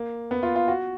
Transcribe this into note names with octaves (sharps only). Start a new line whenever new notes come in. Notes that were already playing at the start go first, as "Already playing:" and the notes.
Already playing: A#3
B3
F4
F4
F#4